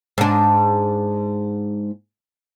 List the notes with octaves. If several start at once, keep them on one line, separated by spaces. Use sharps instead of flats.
G#2 D4